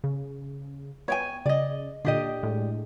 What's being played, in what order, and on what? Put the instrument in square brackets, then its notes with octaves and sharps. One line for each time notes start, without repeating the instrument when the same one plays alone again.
[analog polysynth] C#3
[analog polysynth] B3 [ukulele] C#5 G5 G#5
[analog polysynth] C#3 [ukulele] D5 D#5
[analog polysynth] A#2 D3 [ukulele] D4 G4 D#5
[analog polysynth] A2 G#3